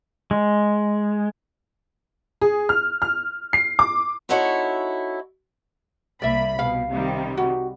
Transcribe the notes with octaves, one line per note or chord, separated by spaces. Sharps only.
G#3
G#4
F6
F6
C7
D6
C4 D#4 E4 F#4 A4 C#5
C2 A#3 D5 E5 B5
B2 F5
C3 D#3 G3
F#4